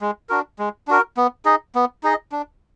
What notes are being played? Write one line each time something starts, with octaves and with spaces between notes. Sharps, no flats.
G#3
D4 F#4 A#4
G#3
D4 F#4 A#4
B3
D#4 G#4 D#5
B3
D#4 G#4 D#5
D4